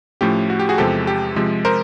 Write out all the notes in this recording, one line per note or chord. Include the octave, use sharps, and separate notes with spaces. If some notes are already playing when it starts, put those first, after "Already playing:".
A2 F3 A3 C#4 G4
F#4
G4
F#4 G#4
E2 C3 F3 G#3 G4 A4
G4
C3 F3 G#3
A#4 C5